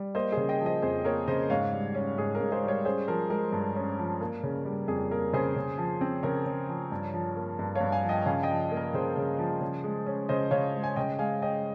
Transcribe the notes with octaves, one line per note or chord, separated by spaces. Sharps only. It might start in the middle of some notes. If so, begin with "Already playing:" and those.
Already playing: G3
A#3 C5 D#5
C#3 G#4 C5
D#5 G5
F3
C5 D#5
F2 G#4 C5
A#3 A#4 C#5
C#3 C5 D#5
G#2 C#5 F5
G3
C#4
G#2 G#4
A#4
G#2
G#4 C5
G3
A#4 C#5
C#4 G#4 C5
F3 A#4
G#3 A#4
G2
C#4
F3
A#3
C#3
G3
F2 G#4
A#3 A#4
C#3 G#4 C5
C#3
F3
C4
C#3 A#4 C#5
C#3
F3
G2
F3
A#3
G2
C#5 F5
G2
F5 G#5
F3
D#5 G5
C#3 F5 G#5
D#5 G5
F3
A#3
A#4
C#3 G#4 C5
C#3
F3
C#3
G#3
C#4
C#3 C5 D#5
C#3 C#5 F5
G#3
G#5
C#3 D#5 G5
G#3 F5 G#5
C#4 D#5 G5